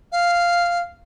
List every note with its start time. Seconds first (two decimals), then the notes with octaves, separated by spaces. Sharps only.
0.12 F5